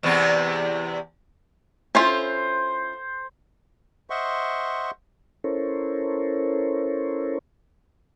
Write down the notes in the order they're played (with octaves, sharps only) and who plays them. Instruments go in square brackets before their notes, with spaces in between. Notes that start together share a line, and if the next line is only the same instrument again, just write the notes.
[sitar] E2 C3 B3
[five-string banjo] C#4 E4 F4 [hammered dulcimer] C5
[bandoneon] C5 D#5 E5 F#5 C6 C#6
[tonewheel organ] C#4 E4 A4 A#4 C5 C#5